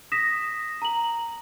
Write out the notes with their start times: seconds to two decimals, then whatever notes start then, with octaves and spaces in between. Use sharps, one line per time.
0.12 D#6 A#6 B6 E7
0.82 A#5 F#7